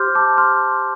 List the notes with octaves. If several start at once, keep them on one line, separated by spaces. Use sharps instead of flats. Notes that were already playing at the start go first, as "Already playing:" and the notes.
Already playing: G4 C5 C6 D6 F6 G6
A5 D6
C6 F6